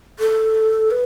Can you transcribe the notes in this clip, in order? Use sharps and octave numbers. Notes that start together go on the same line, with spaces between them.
A4
B4